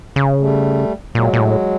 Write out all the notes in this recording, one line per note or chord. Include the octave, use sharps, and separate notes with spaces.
C#3
G3 A3
A#2 F#3 G#3
A#2
A2